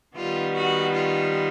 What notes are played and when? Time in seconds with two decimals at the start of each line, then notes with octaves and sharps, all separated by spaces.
0.17 D#3 G3 B3 F4
0.57 F#4
0.96 F4